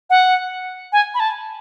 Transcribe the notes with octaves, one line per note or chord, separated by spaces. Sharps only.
F#5
G#5
B5
A5